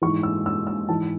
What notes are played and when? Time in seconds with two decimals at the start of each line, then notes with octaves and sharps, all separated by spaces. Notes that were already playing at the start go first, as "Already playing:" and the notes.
0.02 G#2 E3 C#6
0.23 E6
0.46 E6
0.67 E6
0.89 G#2 E3 A5